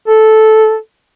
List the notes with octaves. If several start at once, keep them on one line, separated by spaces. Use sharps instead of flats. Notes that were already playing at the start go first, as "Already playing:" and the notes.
A4